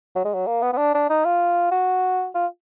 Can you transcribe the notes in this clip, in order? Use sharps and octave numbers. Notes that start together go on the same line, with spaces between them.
F#3
G#3
F#3
A#3
B3
B3
D4
D4
D#4
F4
F#4
F4